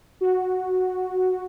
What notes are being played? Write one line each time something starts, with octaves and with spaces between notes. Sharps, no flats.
F#4